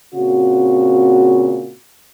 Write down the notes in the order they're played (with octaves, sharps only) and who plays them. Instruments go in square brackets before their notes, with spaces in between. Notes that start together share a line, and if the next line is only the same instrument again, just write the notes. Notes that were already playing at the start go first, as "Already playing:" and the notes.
[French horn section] A#2 C#3 C4 F#4